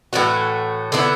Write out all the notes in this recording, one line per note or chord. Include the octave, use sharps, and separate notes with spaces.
A2 E3 A3 F#4
D3 B3 E4